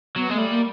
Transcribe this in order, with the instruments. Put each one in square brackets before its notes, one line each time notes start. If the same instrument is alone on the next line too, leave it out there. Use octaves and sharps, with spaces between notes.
[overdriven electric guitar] F#3 [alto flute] B3
[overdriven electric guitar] G#3 [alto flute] A3
[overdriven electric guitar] G3
[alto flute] A#3